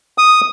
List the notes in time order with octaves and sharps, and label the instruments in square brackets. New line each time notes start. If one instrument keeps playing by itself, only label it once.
[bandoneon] D#6